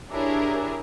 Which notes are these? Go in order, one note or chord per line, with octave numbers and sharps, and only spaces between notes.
D4 E4 G4 G#4 A#4 C#5